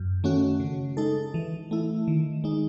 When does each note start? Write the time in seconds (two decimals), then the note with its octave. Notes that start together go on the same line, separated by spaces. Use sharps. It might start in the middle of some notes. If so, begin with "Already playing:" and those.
Already playing: F#2
0.24 D#3 A3 C#4 F#4
0.60 C#3
0.97 G#3 D#4 A4
1.34 E3
1.71 A3 E4
2.08 D#3
2.44 G#3 D#4